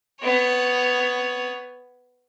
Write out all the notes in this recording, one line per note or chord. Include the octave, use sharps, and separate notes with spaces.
B3 C#5